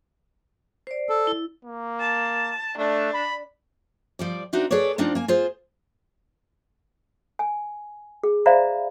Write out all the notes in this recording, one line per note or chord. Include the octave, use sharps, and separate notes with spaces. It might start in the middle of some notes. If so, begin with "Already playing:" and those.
C5 D5
A4
E4
A#3
A5
A3 D4
B5
F3 G3 D5
C4 D4 D#4 F#4 E5
G#4 A4 B4 C#5 D5
F3 C4 D4 D#4 F4
A#3 G#5
F4 G#4 C5
G#5
G#4
C5 D5 E5 F5 A#5 B5